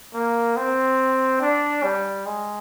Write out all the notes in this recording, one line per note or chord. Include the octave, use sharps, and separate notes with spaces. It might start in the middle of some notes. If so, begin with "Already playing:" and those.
A#3
C4
D4
G3
G#3